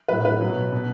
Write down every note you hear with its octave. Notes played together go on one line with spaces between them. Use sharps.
A2 F#3 B4
B4
B2 F#3
B2 F#3